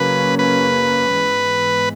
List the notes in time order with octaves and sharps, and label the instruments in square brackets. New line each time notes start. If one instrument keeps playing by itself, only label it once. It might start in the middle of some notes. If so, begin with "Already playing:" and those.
Already playing: [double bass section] F#2 C#3 F#3 A#3 C#4 [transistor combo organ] B4
[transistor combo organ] B4
[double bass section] G#2 E3 G#3 B3